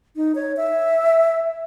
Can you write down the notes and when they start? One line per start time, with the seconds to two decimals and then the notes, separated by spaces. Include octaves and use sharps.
0.16 D#4
0.35 C#5
0.57 E5